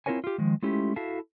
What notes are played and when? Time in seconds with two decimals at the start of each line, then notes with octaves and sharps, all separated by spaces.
0.06 C4 E4 F4 A#4 C#5 G#5
0.24 F4 G4
0.38 D#3 F3 G#3
0.63 G#3 A3 C#4 E4 F4 G4
0.96 E4 F#4 A4 E5 F5 A5